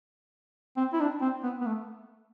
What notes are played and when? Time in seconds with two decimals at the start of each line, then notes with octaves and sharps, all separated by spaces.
0.77 C4
0.93 E4
1.00 D4
1.22 C4
1.44 B3
1.61 B3
1.66 A3